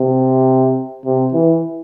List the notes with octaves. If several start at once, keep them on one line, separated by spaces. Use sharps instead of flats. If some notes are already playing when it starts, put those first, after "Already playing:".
Already playing: C3
C3
E3